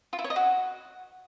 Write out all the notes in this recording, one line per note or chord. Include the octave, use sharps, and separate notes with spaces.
F4
E4
C#5
D#5
F#4